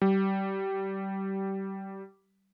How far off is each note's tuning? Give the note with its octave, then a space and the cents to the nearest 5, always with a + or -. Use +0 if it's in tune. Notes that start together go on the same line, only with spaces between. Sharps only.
G3 -20